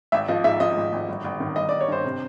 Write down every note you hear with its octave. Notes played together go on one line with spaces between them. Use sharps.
G#1 E5
F3 D#5
G#2 E5
F3 D#5
G#1
G#1
G1
G1
D#3
G1 D#5
D5
G1
C#5
G2 C5
C3